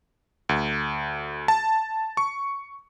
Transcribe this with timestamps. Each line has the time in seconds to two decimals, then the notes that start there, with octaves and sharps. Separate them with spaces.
0.49 D2
1.48 A5
2.17 C#6